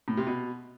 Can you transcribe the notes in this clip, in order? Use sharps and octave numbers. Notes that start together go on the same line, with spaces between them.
A2
C3
B2